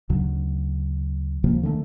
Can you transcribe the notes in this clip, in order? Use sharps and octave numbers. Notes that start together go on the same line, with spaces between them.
D2 C#3 F#3
D2 C3 F3 A#3
D3 D#3 G#3 A3